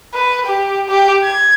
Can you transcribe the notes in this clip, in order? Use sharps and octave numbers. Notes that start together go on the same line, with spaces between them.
B4
G4
G4
G#6